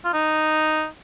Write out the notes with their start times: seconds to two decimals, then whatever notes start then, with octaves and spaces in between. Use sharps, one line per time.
0.05 F4
0.13 D#4